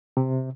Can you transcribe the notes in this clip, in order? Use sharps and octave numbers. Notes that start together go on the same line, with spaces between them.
C3